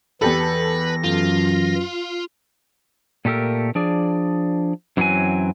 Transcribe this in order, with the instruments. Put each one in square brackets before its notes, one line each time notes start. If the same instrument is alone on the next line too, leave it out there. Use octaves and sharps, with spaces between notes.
[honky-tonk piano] E2 G4 A4 [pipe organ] E3 A#6 [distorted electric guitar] B4
[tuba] F#2 [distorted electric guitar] F4
[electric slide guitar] A#2 A3 G4 A4 A#4
F3 D4 G#4 D5
F#2 E3 F#3 C4 B4 G#5